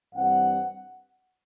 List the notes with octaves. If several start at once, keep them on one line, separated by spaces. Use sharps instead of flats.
G2 E3 G3 C4 F#5